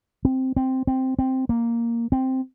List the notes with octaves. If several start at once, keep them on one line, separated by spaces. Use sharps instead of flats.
C4
C4
C4
C4
A#3
C4